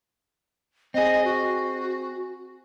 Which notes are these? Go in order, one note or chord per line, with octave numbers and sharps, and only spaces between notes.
C4 G#4 D#5
F#4